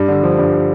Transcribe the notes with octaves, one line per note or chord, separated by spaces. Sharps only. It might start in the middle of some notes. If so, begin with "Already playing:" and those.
Already playing: G2
D3
F3
G2